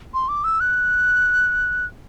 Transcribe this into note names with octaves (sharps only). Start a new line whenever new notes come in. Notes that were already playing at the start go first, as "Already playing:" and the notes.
C6
D6
E6
F#6